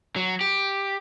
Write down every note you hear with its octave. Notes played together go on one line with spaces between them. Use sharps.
F#3
G4